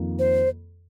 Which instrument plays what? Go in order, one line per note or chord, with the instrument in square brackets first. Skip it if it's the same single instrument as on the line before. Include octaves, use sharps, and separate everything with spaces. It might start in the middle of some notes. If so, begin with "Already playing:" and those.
Already playing: [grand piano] F2 D#3 A#3 F4
[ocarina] C5